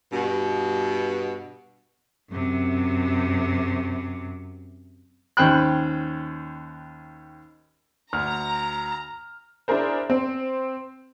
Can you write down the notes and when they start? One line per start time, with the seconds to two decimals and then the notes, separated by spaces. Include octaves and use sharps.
0.13 G2 B2
2.31 F#2 C3
5.37 D#2 C#4 C5 G5 B5 F#6
8.13 D2 A#5 F6
9.68 D4 E4 G#4 A#4 C5
10.10 C4